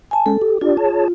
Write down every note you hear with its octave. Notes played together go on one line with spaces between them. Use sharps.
G#5 A5
G#3 C#4 A4
G4
D4 F4 G4 D5
G#4 C#5 A5